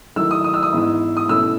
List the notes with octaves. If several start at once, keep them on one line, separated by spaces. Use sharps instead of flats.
D#3 F#3 A3 E4 E6
D#6
D#6
E6
D#6
G#2 E3 B3 E4
D#6
B2 A3 C#4 E4 E6